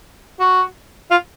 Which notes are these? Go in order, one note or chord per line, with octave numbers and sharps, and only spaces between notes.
F#4
F4